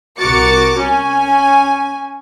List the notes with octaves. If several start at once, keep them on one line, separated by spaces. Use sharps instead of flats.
C2 F#4 A#4 D6 A6 C#7
C#4 G#5